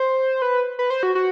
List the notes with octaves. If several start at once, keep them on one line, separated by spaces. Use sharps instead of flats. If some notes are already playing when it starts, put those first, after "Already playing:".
Already playing: C5
B4
B4
C5
F#4
F#4